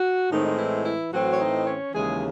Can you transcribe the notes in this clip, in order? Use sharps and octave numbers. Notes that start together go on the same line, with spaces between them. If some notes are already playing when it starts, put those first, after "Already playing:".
Already playing: F#4
A2 D#3 G#3 C4 D#4
D#4
E3 E4
E3 E4
A2 E3 F#3 C4 F#4
C#5
D#4 D#5
C#4 C#5
D#2 C#3 E3 G#3 G#4